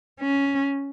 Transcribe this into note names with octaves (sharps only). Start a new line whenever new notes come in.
C#4